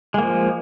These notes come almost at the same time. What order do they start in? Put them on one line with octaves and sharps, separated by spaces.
G#3 A#3 F3